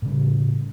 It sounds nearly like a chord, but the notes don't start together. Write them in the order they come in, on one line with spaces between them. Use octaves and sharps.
A2 C#3 G3